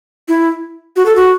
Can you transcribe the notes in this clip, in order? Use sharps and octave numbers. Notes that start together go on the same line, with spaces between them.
E4
F#4
A4
F#4